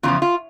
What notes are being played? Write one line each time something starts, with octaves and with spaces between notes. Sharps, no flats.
E2 C#3 F3 F4
F4